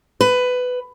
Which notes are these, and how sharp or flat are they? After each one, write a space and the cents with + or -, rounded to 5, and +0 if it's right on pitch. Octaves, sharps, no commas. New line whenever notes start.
B4 +15